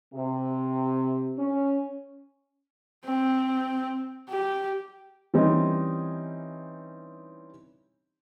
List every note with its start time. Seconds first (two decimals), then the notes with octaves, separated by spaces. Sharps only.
0.13 C3
1.37 C#4
3.05 C4
4.30 G4
5.34 E3 G3 C4 C#4 D#4